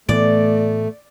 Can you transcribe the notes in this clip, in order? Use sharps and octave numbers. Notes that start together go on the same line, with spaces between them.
A2 E3 A3 B3 D5